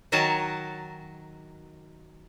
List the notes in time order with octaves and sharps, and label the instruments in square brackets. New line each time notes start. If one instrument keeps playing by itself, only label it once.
[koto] D#3 F#3 F#4 A#4 G#5 A5